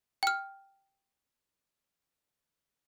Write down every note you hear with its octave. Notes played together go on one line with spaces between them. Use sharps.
G5 F6